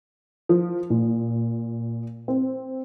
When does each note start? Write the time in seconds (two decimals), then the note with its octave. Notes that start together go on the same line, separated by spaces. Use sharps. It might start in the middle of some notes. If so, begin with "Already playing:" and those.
0.49 F3
0.90 A#2
2.28 C4